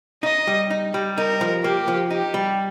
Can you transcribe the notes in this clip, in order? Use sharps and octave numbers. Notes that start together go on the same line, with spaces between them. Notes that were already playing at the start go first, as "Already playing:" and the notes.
D#4 D#5
G3
D#4
G3
D#4 A#4
F3
A#3 G4
F3
D#4 G4
G3